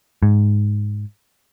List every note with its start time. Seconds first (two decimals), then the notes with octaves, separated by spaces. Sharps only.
0.23 G#2